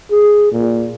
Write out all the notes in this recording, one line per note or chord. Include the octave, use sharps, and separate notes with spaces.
G#4
A#2